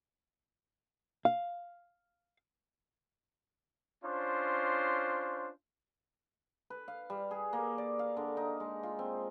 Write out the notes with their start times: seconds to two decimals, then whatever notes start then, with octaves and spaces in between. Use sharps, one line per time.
1.25 F5
4.04 C#4 D4 F4 C5
6.70 B4
6.88 F5
7.10 G3
7.31 G#4
7.53 A#3
7.78 D5
7.99 F5
8.17 D3
8.37 D#4
8.60 G#3
8.83 F4
8.99 C4